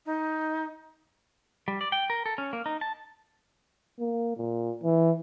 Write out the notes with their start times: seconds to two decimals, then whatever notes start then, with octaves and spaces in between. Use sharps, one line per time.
0.06 D#4
1.68 G3
1.81 D5
1.92 G5
2.10 A#4
2.26 A4
2.38 C#4
2.53 A#3
2.66 D#4
2.81 A5
4.00 A#3
4.37 A#2
4.84 E3